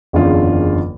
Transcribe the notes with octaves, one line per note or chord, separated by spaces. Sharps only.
F#1 E2 D3 C#4 F4 G#4